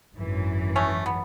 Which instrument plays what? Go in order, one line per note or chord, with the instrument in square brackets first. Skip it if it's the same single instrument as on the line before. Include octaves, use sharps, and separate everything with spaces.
[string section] G#1 F#2 E3
[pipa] A3 C#4
B3